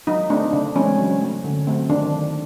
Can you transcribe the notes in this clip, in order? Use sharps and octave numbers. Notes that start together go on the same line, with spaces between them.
F#3 D#4
A3 C4 D4
C#3 D4
E3 G#3 C4 C#4
F#3
A3 C#4
D3
F#3 A3 C4
D#3 D4